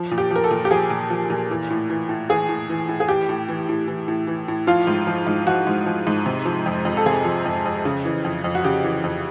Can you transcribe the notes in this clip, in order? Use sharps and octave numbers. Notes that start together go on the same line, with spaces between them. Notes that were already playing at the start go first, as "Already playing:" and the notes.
Already playing: F3
A#2
G4
F3
A#4
A4
A#2
G4
F3 G#4
A#2
F3
A#2
E3
A2
E3
A2
E3 G#4
A2
E3
A2
G#4
E3 G4
A2
E3
A2
E3
A2
E3
A2
F3 F4
G#2
F3
G#2
F3 F#4
G#2
F3
G#2
C3
F3
F2
F2
A4
C3 G#4
F3
F2
F2
C#3
E3
F2
F2
F#4
C#3 G4
E3
F2